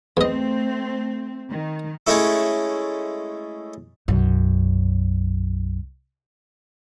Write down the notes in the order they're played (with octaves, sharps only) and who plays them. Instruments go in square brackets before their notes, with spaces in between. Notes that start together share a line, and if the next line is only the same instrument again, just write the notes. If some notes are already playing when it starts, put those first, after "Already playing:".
[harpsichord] E2 D#5 [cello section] A3 C4
[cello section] D#3
[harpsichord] G#3 A3 C#4 E4 A4
[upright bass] B1 F#2